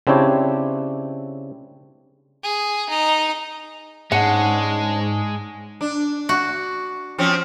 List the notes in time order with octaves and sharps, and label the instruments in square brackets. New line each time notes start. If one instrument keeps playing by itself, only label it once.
[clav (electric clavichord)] C#3 C4 D4 E4 G4 C#5
[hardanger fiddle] G#4
D#4
[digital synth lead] G#2 [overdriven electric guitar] G#3 [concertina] C#4 D4 [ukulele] F#5
[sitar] D4
[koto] F#4
[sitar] F3 C4 C#4